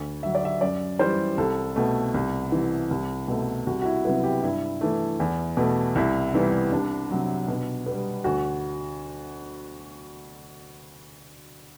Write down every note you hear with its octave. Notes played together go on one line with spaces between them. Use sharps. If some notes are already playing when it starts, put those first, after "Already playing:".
Already playing: D2
D3 F#3 E5
D5
E5
F#2 D5
E3 G3 C5
C2 A4
B2 A3
C2
C3 E3
C2
B2 A3
C2 F#4
F#4
E4
C3 F#3 B3 E4
G4
G2 E4
E3 A3
E2
B2 A3
C2 E4
C3 E3 G3 B3
C2 D4
C3 F#3
B2
G3 B3
D2 F#4